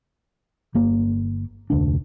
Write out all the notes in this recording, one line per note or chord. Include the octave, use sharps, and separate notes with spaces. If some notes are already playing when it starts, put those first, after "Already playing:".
G1 A#3
F1 D2 D4